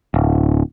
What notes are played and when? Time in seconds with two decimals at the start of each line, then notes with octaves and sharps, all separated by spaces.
0.14 D1